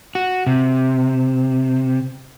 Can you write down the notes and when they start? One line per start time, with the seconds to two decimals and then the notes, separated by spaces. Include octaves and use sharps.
0.15 F#4
0.47 C3